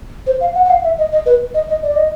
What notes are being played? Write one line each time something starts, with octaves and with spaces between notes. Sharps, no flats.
C5
F5
F#5
F#5
F5
E5
D#5
D#5
B4
D#5
D#5
D5
D#5